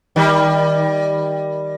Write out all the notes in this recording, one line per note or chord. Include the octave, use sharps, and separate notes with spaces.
D#3 G3